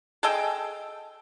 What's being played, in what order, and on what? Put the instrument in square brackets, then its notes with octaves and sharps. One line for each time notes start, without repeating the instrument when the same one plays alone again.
[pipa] G#4 A4 D#5 G5